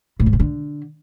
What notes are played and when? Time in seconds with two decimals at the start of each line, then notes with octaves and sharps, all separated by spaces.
0.20 A2
0.26 G#2
0.33 C3
0.40 D3